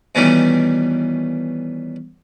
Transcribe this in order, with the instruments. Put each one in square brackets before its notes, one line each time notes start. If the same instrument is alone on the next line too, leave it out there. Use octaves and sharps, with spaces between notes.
[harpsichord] B2 D#3 E3 G3 A3 C#4